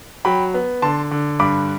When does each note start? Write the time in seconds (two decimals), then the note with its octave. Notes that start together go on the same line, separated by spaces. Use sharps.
0.25 F#3 G5 B5
0.54 B3
0.82 D3 A5 C6
1.11 D3
1.39 G2 B5 D6